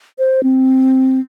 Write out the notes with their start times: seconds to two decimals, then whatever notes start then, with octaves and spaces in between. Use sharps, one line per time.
0.19 C5
0.43 C4